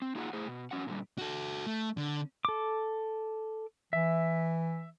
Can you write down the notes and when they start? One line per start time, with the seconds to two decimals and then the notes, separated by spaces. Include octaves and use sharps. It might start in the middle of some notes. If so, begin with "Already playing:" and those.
0.02 C4
0.15 A#3 D#4 F4 G#4 C#5 F#5
0.33 A3 E4 G#4 C5
0.48 B2
0.71 E2 C#4 F#4 F#5
0.87 A#2 D3 E3 G3
1.18 F#4 A4
1.67 A3
1.97 D3
2.45 A4 D6
3.93 E3 E5